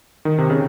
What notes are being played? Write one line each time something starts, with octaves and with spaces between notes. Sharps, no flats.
D#3
C3
C#3